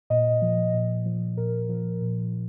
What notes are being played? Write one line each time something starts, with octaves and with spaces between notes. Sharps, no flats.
A#2 D#5
F3
A#2
F3
A#2 A#4
F3
A#2
F3